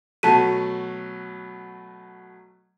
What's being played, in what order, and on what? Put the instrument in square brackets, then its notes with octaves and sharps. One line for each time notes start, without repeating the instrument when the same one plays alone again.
[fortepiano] B2 F#3 A3 [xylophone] A5 B6 D#7